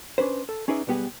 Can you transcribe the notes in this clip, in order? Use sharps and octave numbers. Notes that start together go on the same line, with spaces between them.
C#4 D4 B4 C5
A4
C#4 D#4 G#4 B4 D5 E5
B1 G3 B3 G4 G#4 B4